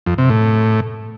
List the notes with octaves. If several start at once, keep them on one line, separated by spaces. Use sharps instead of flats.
F2
C3
A2